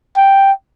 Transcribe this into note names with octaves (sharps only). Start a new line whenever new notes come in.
G5